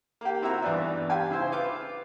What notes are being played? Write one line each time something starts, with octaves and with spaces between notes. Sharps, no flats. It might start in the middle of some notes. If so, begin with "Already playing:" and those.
A#3 G4
C4 E4 F#4 E5 A#5
E2 G2 E3 D4 B4 E5
G4 F5 G5 G#5
C#3 E4 C5
F4 B4 D6